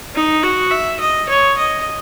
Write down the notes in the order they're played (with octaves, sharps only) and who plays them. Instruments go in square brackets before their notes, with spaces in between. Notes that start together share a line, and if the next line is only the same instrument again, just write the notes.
[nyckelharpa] D#4
F#4
E5
D#5
C#5
D#5